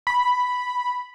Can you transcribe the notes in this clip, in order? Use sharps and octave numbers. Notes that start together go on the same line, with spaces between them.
B5